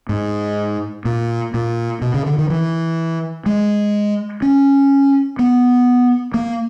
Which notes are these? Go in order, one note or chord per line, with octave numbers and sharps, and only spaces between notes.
G#2
A#2
A#2
B2
C#3
D3
D#3
E3
G#3
C#4
B3
A#3